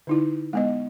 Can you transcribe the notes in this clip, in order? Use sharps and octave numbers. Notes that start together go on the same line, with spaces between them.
D3 D#4 E4
G#3 B3 D#5